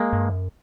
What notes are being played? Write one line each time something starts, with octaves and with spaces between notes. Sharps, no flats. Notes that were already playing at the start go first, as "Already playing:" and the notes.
Already playing: G#3 A#3
G2
F#2